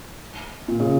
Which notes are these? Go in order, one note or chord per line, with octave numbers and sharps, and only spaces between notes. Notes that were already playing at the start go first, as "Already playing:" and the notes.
A#2
C#3